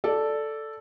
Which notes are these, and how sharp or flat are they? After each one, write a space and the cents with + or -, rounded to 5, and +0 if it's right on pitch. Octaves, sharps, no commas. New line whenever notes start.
A4 +0 D5 +0